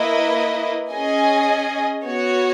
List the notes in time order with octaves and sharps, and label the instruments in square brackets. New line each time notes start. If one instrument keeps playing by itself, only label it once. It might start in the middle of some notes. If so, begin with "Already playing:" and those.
Already playing: [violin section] A#3 E4 B4 D#5
C#4 G#4 D#5 G#5
B3 F#4 C#5